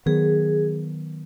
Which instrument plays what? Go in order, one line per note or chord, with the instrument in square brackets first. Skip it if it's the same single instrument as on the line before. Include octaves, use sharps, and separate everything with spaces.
[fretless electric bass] D#3 F#3 B3 [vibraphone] G#4